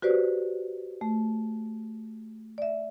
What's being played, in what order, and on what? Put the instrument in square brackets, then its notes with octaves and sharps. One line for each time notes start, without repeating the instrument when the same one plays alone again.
[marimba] F#4 G4 B4 C5 D5
A3
D5 E5